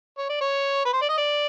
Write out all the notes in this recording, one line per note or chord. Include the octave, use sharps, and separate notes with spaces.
C#5
D5
C#5
B4
C5
D5
D#5
D5